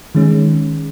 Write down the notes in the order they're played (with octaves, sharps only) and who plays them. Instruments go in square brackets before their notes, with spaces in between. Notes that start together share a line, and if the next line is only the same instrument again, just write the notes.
[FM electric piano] D#3 G#3 C#4